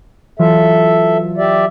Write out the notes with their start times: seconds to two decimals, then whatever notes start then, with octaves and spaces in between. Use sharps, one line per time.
0.39 E3 F#3 F4 A4 E5
1.38 G4 D5 E5